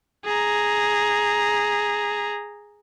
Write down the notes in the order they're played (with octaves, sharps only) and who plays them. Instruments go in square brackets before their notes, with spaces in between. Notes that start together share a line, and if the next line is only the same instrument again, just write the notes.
[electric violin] G#4 A#5